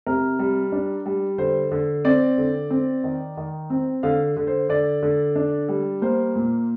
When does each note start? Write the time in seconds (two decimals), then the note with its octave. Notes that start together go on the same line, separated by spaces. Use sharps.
0.07 C3 A#4
0.39 G3
0.72 D4
1.06 G3
1.38 D3 C5
1.72 D3
2.05 C4 D5
2.38 D3
2.70 C4
3.04 D#3
3.37 D#3
3.70 C4
4.03 D3 F5
4.37 D3
4.47 C5
4.69 D3 D5
5.03 D3
5.36 D4
5.69 G3
6.02 A#3 C5
6.35 A#2